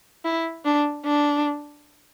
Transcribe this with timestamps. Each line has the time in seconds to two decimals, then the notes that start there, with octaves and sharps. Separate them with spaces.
0.25 E4
0.65 D4
1.05 D4